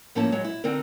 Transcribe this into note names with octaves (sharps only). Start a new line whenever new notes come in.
A2 F3 A#3 C#4 E4 A5
F#3 G#3 C#5
E4
D3 C4 D#4 A#4